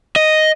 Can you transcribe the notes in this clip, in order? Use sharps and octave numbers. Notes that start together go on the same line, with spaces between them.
D#5